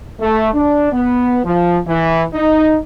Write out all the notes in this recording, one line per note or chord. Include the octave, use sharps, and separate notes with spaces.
A3
D4
B3
F3
E3
D#4